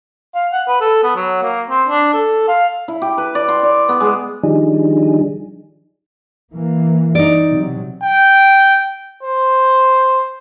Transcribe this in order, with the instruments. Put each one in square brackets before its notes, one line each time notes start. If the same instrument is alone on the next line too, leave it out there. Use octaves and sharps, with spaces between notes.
[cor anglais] F5
F#5
B4
A4
B3
F#3
A#3
C4
D4
A4
F5
[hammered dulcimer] E4
G4
B4
D5
C6
D5
B3
G#3
[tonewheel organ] D#3 F3 G3 D4 D#4 G#4
[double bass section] E3 A#3
[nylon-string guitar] D#4 D5
[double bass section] C3 F#3
[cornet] G5
C5